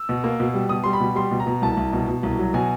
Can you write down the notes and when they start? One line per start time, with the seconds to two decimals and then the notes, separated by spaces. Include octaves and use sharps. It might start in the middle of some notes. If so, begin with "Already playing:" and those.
Already playing: E6
0.09 B2
0.24 A#3
0.40 B2
0.54 G3
0.69 B2 D#6
0.84 G3 C6
0.93 B5
1.00 B2
1.16 G3 C6
1.31 B2
1.40 A#5
1.47 B2
1.62 C2 A5
1.77 C2
1.93 B2
2.08 B2
2.23 C2
2.39 F#3
2.54 B2 G#5